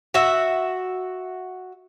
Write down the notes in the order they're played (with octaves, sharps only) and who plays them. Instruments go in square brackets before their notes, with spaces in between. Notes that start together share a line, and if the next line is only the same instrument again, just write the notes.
[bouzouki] F#4 E5